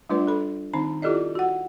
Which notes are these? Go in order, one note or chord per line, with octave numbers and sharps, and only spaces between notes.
G3 A3 D4 F4 B4 D5
A4 B5
D#3 C4 D#4 A#5
E4 F4 G4 A4 D5 D#5
F#4 F#5